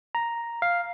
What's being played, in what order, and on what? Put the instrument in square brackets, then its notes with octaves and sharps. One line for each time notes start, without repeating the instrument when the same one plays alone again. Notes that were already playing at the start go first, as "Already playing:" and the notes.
[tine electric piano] A#5
F5